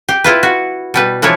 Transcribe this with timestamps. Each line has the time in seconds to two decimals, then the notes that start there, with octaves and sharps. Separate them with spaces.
0.09 G4
0.24 E4 F4 B4
0.43 F#4
0.94 B2 G3 B4
1.22 E3 F3 D4 E4 C#5